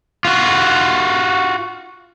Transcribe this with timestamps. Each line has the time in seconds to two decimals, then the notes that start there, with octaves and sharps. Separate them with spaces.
0.25 F4 F#4